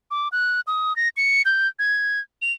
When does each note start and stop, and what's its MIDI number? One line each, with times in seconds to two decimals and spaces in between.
0.11 0.28 86
0.32 0.61 90
0.67 0.96 87
0.96 1.09 94
1.17 1.42 97
1.45 1.68 91
1.79 2.20 92
2.42 2.53 101